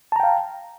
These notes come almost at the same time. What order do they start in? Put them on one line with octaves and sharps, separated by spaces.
A5 A#5 G5 F5